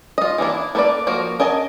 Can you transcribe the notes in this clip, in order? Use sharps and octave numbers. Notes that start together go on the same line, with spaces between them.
F4 D#5
E3 A#3 D4 E4
A#3 A4 B4 C5 D5
F3 A#3 F#4 A#4
A#4 D#5 G#5 A5